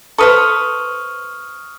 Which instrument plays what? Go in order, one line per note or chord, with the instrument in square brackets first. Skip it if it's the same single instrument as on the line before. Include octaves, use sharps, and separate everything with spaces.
[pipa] A4 B4 C5 [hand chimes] C#6 D#6 F6